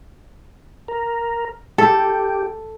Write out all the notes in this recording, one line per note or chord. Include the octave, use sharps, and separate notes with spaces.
A#4
G4 A4